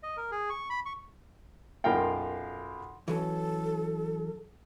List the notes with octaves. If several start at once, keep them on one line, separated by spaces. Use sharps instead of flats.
D#5
A#4
G#4
C#6
B5
C#6
B1 F#2 F4 A#4 F5 G5
E3 F#3 C#4 A4